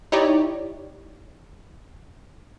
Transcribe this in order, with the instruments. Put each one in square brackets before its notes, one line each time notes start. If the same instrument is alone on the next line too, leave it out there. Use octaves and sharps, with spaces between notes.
[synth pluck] D#4 E4 G4 C#5 D5